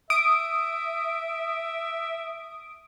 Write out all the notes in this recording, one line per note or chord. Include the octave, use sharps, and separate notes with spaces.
E5 D#6 D7